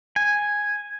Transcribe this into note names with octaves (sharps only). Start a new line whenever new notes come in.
G#5